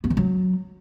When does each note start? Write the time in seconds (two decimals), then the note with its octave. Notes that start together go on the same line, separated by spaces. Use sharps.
0.04 B3
0.10 E3
0.17 F#3